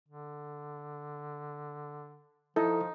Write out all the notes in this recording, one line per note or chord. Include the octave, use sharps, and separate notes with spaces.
D3
F3 D#4 E4 A4